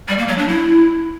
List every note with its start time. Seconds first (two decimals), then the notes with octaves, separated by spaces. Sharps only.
0.08 G3
0.18 A#3
0.28 F#3
0.38 D4
0.48 E4